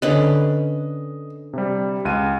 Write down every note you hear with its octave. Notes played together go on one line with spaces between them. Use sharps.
D3 C#4 B4 D#5
C3 G3
C#2 D#7